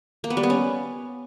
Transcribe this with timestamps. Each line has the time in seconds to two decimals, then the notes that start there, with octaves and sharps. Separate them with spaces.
0.24 A#3
0.30 B3
0.37 G3
0.43 B3
0.50 C#4